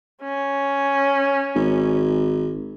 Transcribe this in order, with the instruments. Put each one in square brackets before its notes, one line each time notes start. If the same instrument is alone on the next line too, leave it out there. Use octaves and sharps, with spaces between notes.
[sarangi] C#4
[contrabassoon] G#1